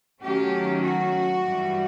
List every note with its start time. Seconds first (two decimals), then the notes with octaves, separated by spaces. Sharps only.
0.22 D#3 F#3 A3 C#4 G4
0.82 F#4
1.42 G2 E3 G3